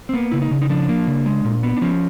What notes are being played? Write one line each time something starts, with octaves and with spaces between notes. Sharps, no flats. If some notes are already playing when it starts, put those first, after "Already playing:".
C4
A#3 B3
C#3 E4
D#4
C#3
D#4
F3 D4
A#3
C#3
G#3
A#2
B3
D4
F3 C#4